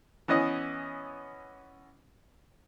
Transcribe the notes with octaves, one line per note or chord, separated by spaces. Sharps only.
E3 B3 C#4 D#5